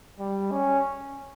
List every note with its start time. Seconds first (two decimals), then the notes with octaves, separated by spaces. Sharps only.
0.19 G3
0.51 C#4